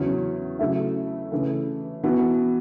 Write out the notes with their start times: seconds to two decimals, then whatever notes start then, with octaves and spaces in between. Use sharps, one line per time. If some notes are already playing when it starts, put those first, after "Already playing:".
Already playing: E2 C#3 F#3 C#4
0.59 C#3 F#3 A3 E4
1.32 C#3 E3 A3
2.04 E3 B3 F#4